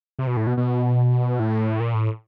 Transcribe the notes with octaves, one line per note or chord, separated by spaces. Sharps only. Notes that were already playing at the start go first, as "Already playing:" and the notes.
C3
B2
A2
B2
B2
A2
A#2
A2